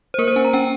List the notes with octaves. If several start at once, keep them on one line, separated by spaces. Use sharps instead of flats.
C5
A#3 A#4
C5
C#4 G#5
A#5
C#4 G5